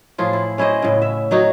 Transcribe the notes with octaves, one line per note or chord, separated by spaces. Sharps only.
A2 F3 F4 G#4
E4
C#4 E4 C5 D#5
A2 C#3
E5
F#3 D#4 F#4 C#5